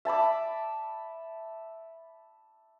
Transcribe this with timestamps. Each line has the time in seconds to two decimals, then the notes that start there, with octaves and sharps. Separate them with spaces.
0.05 E5 A5 B5 D6